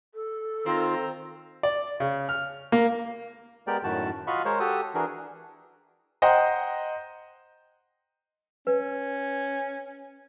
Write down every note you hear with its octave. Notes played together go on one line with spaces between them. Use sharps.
A4
D#3 C4 F4 A#5
D5
C#3
F6
A#3
G#3 B3 G4 A#4 D5 G5
F#2 A2 D#3 F#4 A5
F4 F#4 D#5 F5 B5 C#6
G#3 A#4 C5 C#5
F#4 G4 A4 D#6
E3 D4 F#4 G#4 A#4
C5 D#5 F#5 G5 A#5
C#4 B4